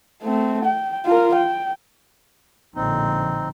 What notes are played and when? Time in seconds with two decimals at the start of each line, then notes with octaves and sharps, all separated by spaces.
0.23 A3 C4
0.65 G5
1.06 F4 A#4
1.35 G5
2.75 A#1 A2 D3 C4 D#4